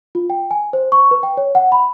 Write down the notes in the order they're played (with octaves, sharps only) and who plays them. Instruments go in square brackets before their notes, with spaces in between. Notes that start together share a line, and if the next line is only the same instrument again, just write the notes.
[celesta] F4
G5
G#5
C5
C#6
B4
G5
C#5
F#5
B5